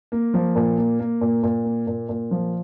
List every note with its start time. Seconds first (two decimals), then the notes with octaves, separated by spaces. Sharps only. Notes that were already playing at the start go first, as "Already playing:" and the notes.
0.12 A#3
0.34 F3
0.56 A#2
0.77 A#3
1.00 A#3
1.21 A#2
1.43 A#2
1.65 A#3
1.87 A#2
2.09 A#2
2.31 F3